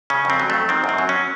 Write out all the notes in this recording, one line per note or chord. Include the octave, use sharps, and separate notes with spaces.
C#3 C#4
F2 C4
F#3
F2 A3
D#3 C4
F#2
C4
F#3
C#4